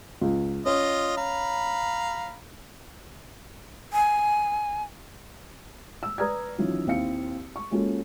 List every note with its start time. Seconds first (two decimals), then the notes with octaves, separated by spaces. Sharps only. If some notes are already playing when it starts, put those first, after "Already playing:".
0.21 C#2
0.66 C#4 F4 D#5
1.17 F5 A#5 B5
3.93 G#5
6.03 E6
6.18 B4 D5 A#5 D#6 F6 G#6
6.58 D#3 E3 F#3 C#4 F4
6.86 D#2 C4 E4 F5 C#7
7.56 C#6
7.71 G#3 A#3 C#4 F4 F#4 A4